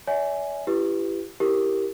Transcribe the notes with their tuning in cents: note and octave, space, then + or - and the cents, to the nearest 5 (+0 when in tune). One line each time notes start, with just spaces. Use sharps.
C#5 +45 E5 -30 G#5 +0
E4 +35 G4 +0 B4 +0
E4 +0 G4 +0 A#4 +0